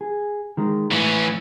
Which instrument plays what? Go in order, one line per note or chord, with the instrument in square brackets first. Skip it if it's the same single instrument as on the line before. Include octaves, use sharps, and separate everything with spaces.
[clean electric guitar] G#4
D#3 G#3
[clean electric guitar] A2 [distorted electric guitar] E3 C#4